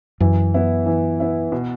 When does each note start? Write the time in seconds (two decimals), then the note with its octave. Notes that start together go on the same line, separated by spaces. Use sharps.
0.20 F#2 E3
0.54 B3 E4
0.86 E3
1.20 B3 E4
1.52 B2